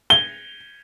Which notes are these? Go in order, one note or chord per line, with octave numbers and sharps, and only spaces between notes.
G7